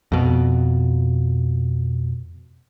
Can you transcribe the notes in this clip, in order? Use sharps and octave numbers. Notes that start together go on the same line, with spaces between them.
F2 B2